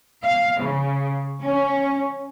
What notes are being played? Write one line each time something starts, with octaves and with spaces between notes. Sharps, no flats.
F5
C#3
C#4